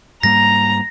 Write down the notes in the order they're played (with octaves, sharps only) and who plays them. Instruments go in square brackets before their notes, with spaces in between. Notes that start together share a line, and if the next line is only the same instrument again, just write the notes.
[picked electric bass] G#2 G3 A#3 [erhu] A#5 [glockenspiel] A#6